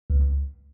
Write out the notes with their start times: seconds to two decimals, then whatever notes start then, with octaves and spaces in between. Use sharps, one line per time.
0.10 C#2